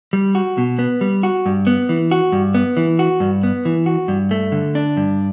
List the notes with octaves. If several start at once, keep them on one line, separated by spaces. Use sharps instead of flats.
G3
F#4
B2
B3
G3
F#4
G2
B3
E3
F#4
G2
B3
E3
F#4
G2
B3
E3
F#4
G2
A3
D3
D4
G2